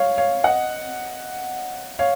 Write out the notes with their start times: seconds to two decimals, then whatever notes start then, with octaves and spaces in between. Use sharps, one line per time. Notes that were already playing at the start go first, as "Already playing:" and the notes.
Already playing: C#5 F5
0.18 C#5 F5
0.44 D#5 F#5
1.99 C#5 F5